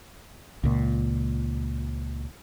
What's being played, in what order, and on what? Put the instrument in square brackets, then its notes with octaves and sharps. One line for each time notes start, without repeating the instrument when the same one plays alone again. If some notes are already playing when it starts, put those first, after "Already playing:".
[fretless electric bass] C#2 A#2